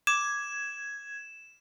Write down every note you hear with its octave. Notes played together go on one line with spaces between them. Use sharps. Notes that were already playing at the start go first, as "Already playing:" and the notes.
D6 G#6 E7